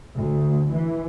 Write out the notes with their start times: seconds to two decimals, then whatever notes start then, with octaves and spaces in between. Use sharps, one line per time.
0.14 D2
0.74 E3